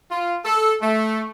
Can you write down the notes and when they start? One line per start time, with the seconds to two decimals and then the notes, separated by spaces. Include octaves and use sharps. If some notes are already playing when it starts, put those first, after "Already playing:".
0.11 F4
0.45 A4
0.81 A3